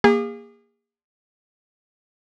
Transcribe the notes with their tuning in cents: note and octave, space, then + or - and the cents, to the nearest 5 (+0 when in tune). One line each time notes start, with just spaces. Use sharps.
A#3 +0 G#4 -35